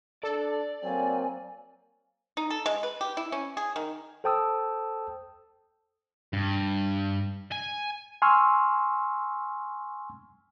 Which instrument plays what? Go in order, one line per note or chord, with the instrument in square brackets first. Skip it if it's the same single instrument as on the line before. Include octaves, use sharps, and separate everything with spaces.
[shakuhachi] D4 [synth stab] A4 [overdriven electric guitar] D5
[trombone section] F#3 A#3 C4 [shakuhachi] G#5
[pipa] D#4
A4
G#3
B4
G4
E4
C#4
G#4
D#3
[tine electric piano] A4 C5 G5 A5 D#6 E6
[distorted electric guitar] G2
G#5
[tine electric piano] G#5 C6 C#6 E6 F6